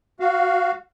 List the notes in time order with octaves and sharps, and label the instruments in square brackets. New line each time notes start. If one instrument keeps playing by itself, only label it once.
[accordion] F#4 F5